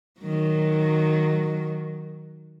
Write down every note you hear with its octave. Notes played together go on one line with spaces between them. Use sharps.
D#3 F#3